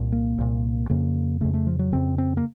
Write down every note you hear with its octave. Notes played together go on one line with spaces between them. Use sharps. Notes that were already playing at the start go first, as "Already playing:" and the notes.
Already playing: C2 A#2
A#3
C2 A#2
F2 C#3 A#3
F2 C#3 A3
A3
F3
F#3
F2 C#3 C4
C4
A#3